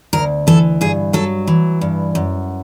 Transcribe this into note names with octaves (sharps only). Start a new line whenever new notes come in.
D2 A#4
E3 A4
G2 G#4
F#3 A4
E3
G2
F#2